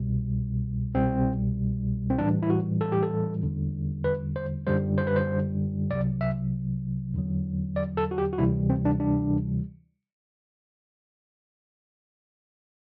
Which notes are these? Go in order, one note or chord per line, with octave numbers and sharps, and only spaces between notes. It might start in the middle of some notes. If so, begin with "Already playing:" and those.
Already playing: C2 B2 G3
C2 B2 G3 C4
C4
A2 E3 G3 D4
E4
F#4
A4
G4
A4
E2 D3 G3
B4
C5
F#2 D3 G3 C5
C5
B4
C5
C2 C3 F#3 D5
E5
E2 D3 F#3
D5
A4
F#4
G4
F#4
D2 C3 E3 G3 E4
C4
D4
D4